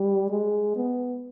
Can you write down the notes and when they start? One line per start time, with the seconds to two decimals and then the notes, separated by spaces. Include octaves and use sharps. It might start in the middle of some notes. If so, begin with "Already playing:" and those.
Already playing: G3
0.30 G#3
0.76 B3